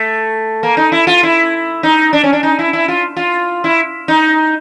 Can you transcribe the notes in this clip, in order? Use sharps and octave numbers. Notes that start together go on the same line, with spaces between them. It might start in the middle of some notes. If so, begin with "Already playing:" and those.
Already playing: A3
A#3
D#4
E4
F4
E4
D#4
D4
C#4
D4
D#4
E4
E4
F4
F4
E4
D#4